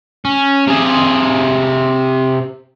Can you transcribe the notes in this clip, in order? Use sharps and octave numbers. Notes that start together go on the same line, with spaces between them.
C#4
C3 G#4